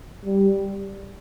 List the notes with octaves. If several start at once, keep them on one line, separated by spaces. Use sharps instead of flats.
G3